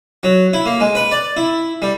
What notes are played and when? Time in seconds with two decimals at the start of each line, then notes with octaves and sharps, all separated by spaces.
0.23 F#3
0.53 E4
0.66 A#3
0.80 G#3
0.95 B4
1.11 D5
1.37 E4
1.82 G3